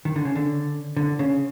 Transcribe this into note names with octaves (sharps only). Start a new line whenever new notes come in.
D#3
D3
C#3
D3
D3
C#3